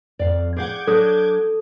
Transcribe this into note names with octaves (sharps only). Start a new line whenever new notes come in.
F2 D5 F5
G#4 F5 F#5 D6 G6 G#6
F#3 D4 A4 D#6